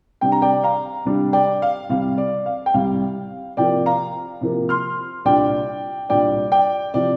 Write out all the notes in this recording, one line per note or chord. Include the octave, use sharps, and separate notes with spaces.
C3 G3 D4 G5
A#5
D5 G5
F5 A#5
C3 G3 D4
D5 G5
F5
C2 C3 G3 F5
D5
F5
G5
C2 C3 G3 F5
C3 F3 A#3 D5 G5
F5 A#5
C3 F3 A#3
C6 F6
C2 A#2 G3 D4 D5 G5
C2 A#2 G3 D4 D5 G5
D5 G5
C3 F3 D5